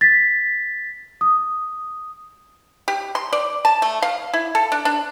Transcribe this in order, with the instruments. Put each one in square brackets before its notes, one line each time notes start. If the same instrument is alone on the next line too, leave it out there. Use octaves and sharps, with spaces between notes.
[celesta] A6 B6
D#6
[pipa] G4
C6
D5
A5
A3
F5
E4
A4
D4
D4